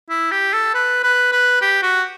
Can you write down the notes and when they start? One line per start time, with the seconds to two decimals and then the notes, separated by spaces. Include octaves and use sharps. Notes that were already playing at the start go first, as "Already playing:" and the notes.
0.09 E4
0.31 G4
0.53 A4
0.74 B4
1.03 B4
1.32 B4
1.61 G4
1.83 F#4